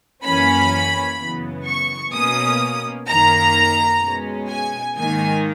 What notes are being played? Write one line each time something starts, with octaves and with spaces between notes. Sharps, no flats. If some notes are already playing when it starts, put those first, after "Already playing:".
F#2 E3 A#3 C#4 B5
F#2 C#3 E3 B3
C#6
B2 A#3 C#4 D#6
F#2 D#3 A#3 A#5
B2 G#3 C#4
G#5
G#2 D#3 A#3 D#4 G#5